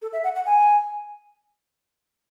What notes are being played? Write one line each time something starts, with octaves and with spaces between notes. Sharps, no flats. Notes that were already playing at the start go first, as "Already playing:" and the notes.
A4
E5
F#5
F#5
G#5